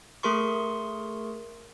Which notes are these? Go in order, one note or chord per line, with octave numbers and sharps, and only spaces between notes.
A3 G#4 A#4 C6 C#6